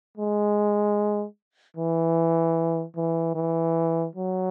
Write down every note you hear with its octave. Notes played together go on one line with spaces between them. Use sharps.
G#3
E3
E3
E3
F#3